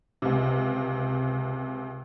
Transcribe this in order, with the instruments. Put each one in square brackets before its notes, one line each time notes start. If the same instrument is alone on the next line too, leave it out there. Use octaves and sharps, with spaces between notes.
[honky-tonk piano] C#2 C3